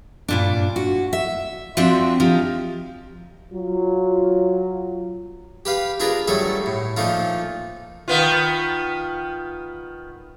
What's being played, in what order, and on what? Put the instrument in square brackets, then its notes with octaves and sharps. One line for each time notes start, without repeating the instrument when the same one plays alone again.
[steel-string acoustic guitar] G2 A#2 D4
F#4
E5
F3 C4 D4 F#4 E5
F3 D#4 G4
[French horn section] F#3 F4
[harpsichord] G4 B4 F5
D4 F4 G#4 A#4 B4
F#3 G3 A3 G#4 A4
A2
A#2 F3 A3 D#4 F4
[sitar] D#3 B3 F4